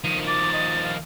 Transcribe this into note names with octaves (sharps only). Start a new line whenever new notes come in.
D#3 F3 D#7
D6 A6
D#5
F5